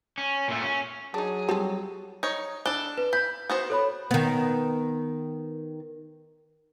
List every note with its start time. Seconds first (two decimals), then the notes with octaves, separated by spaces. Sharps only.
0.18 C#4
0.48 A#2 A3
0.63 C#4
1.14 F#3 D4 D#4 G#4
1.49 G3 C4 F4 A4
2.23 D#4 C#5
2.66 D4 A4 G7
2.98 B4
3.13 B5 G6
3.49 B3 F#4 C5
3.70 A4 C#5 B5
4.11 D#3 B3